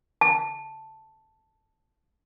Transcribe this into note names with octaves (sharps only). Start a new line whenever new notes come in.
A5